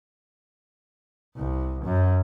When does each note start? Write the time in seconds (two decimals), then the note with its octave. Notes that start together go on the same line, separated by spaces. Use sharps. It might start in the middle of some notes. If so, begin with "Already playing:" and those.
1.36 C2
1.85 F#2